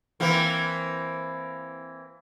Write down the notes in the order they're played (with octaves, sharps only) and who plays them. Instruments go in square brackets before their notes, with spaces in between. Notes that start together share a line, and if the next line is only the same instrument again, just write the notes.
[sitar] E3 A#3 C4